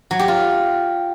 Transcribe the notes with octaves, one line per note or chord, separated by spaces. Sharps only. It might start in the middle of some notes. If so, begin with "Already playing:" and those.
F#3
G4
F4